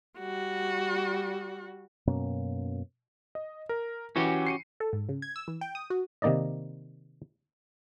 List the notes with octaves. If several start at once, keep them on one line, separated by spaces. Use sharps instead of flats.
G3 F#4
F#2 B2 A#3 C#4
D#5
A#4
E3 C#4 F#4 G4
C7 C#7 D#7
A4
G#2
C#3
G#6
E6
E3
G5
D#6
F#4
C3 D#3 A#3 D#4 D5 D#5